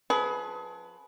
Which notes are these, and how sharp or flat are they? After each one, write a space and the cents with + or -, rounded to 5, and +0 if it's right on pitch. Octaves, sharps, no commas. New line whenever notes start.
F3 +25 G#4 +30 B4 +0